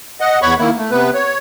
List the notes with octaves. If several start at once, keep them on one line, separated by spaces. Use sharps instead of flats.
D#5 F#5
E2 C#5 F#5 B5 C#6
D#3 A#3 E4
A3
C3 B3 B4
C#5